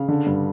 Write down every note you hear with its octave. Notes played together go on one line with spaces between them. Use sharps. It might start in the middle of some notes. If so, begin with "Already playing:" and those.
Already playing: C#3 F5
D3
G2